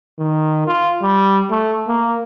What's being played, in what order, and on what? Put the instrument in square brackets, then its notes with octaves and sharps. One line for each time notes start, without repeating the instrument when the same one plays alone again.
[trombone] D#3
F4
G3
A3
A#3